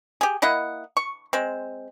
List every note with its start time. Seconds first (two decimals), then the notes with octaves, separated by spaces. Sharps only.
0.21 G4 G#4
0.42 A#3 E4 D#5 F#5
0.97 C#6
1.33 G#3 C4